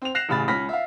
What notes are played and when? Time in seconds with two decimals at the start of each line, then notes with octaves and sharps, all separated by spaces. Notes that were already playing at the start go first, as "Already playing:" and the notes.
0.02 C4 F7
0.15 F#6 A#6 C7 E7 F7
0.29 A1 C#3 B5 A6
0.48 C#2 C#4 B5 F6 A#6 B6
0.69 E5 F5